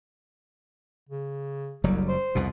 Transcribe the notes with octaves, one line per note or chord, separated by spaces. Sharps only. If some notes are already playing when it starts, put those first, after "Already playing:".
C#3
F#1 C2 F#3 G3
C5
C2 F2 B2